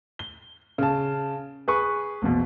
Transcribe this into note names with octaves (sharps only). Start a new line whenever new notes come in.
G7
C#3 A5
G#4 B4 C#6
A#1 E2 B2